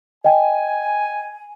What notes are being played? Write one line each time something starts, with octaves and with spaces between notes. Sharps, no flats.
D#5 G5 G#5